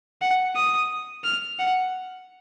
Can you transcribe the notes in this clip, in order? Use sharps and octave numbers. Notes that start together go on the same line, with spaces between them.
F#5
D#6
F6
F#5